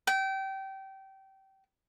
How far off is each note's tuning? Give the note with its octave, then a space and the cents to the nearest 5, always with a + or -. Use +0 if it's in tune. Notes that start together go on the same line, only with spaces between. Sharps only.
G5 -25